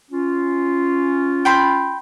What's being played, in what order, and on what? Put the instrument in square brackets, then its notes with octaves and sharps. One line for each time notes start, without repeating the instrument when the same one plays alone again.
[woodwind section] C#4 F4
[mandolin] G5 B5 C6